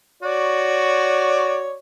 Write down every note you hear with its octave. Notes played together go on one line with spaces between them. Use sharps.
F#4 C#5 D5